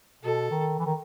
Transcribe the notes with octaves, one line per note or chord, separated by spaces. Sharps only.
B2 A4
D#3
E3
D#3